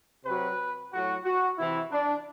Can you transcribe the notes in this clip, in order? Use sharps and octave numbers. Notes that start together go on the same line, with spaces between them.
C3 F#3 B4
A2 F#3 F#4
F#4
C3 E3 E4
D4